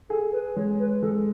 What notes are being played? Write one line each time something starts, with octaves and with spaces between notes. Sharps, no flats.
G#4 A4
B4
G#3 C#5
B4
G#3 A4